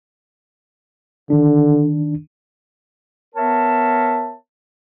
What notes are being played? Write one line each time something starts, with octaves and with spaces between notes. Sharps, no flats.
D3 D#3 D4
B3 A#4 C#5 E5 A5